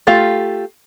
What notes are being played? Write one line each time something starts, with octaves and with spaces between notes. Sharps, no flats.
A3 F4 G4 F5